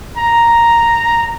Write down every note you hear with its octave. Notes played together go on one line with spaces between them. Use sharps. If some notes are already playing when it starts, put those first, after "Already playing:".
A#5